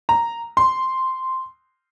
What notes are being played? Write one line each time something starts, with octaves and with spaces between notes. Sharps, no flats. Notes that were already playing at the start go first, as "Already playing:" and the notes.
A#5
C6